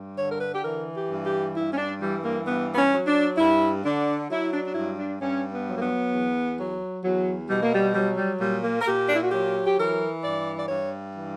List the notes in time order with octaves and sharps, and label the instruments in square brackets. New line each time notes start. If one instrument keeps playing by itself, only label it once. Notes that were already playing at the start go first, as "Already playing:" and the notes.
Already playing: [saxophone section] G2
D3 C#5
A#4
B4
G4
E3 A#4
G4
G2
G4
G2 E4
C#4
D4
E3 G3
A#3
G2 B3
B3
C#4
F#3
D4
G2 E4
D3 D4
F#3 E4
D4
D4
G2 E4
D4
G2 C#4
B3
F#3
A#3
B3
E2
F#3
E2 F#3
B2 G3
A#3
G3
F#3 G3
G3
A#2 G3
A#3
A#4
A#2 G4
D4
E4
F#4
F#3 G4
G4
E3 A#4
G2 D5
D5
G2 C#5
E3